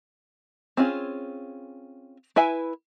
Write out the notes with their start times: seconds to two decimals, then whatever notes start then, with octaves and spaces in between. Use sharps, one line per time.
0.77 C4 C#4 F4 G#4
2.36 E4 B4 E5 G#5